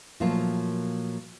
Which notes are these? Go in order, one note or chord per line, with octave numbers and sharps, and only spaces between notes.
A#2 F3 F#3 A3 A#3 F4